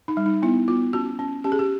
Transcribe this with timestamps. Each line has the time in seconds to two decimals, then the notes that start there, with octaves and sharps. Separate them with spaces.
0.08 D#4
0.17 G3
0.26 D#4
0.42 B3 E4
0.68 B3 F4
0.93 C#4 F#4
1.19 C#4
1.44 C#4 G4
1.52 G#4
1.59 G4